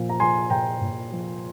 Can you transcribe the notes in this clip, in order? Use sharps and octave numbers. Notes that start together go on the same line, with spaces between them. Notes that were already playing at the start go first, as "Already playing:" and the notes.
Already playing: A#2 F3
A#5
F3 G#5 C6
A#2 G5 A#5
A#2
F3